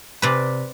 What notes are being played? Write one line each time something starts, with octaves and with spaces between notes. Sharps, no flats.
C3 B4 D5